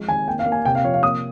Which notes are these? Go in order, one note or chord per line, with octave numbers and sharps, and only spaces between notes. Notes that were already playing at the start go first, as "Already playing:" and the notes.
Already playing: F3 G#3
D#3 G#5
A#3 G5
F5
A#3
G#5
C3 G5
F5
F3 C#5
F5
A#3 D#6